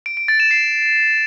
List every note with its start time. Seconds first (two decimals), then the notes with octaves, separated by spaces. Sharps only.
0.06 D7
0.17 D7
0.28 A6
0.40 E7
0.51 C7